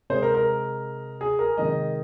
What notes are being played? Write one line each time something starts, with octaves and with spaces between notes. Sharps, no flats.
C3 G#3 C5
A#4
A#4
G#4
A#4
C3 D#3 G#3 D#5